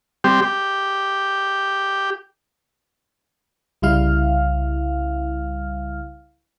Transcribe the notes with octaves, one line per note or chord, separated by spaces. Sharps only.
G3 C4 G4
G4
C2 C#3 G3 E4 F5 F6